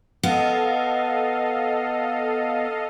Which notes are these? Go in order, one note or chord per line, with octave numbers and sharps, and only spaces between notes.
B3 A4 D#5 F5